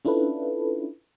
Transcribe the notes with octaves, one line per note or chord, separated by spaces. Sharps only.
C#4 D4 E4 F4 A4 B4